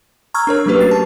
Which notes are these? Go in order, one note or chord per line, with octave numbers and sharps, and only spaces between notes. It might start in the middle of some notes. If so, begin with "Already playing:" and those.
A#5 C#6 E6 F6 G#6
D4 A#4 C#5
F#3 A3 A#3 C#4 G4 B4
F#4 A6 C7
A5